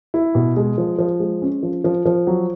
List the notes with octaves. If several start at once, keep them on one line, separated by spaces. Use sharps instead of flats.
E4
B2
G#3
F3
F3
G#3
C#4
F3
F3
F3
F#3